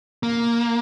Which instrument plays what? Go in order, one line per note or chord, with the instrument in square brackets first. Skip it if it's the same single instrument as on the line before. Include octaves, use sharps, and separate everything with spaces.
[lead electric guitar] A#3